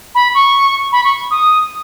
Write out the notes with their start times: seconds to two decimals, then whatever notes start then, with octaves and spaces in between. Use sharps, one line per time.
0.15 B5
0.35 C#6
0.92 B5
1.05 C#6
1.31 D#6